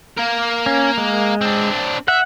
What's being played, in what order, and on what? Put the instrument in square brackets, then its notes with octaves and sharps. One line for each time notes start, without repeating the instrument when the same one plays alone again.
[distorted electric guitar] A#3 A#4
[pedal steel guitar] C#4
G#3
[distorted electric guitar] C4 D4
[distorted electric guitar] E5 [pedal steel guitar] F#5